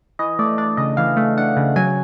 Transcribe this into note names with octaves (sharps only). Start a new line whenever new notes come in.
E3 D#5
A3 D5
D4 D5
C#3 D#5
E3 F5
A3
D4 F#5
C#3
F#3 G#5